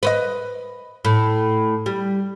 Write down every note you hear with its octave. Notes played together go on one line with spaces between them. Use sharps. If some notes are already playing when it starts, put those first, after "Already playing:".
B4 C5 D#5
A2
G3